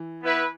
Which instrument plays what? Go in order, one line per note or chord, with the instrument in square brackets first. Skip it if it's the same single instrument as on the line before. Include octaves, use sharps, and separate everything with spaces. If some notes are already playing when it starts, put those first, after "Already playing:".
Already playing: [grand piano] E3
[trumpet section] B3 E4 B4 E5